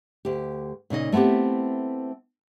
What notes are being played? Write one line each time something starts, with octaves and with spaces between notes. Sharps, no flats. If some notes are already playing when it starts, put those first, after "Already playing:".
D2 G4
A#2 C#3 D#4 D#5
A3 B3 C4 E4 G4